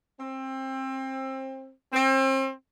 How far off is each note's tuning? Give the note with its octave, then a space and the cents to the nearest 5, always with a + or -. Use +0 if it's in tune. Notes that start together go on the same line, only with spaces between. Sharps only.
C4 +25
C4 +35